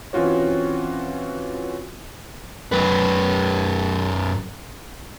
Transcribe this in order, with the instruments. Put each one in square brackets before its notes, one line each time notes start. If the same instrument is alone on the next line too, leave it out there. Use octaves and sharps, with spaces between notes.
[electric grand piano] E3 C4 C#4 F4 F#4 C#5
[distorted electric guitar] F#2 B4